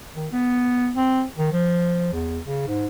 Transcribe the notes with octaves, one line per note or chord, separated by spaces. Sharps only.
D#3
B3
C4
D#3
F3
E2
C#3
G#2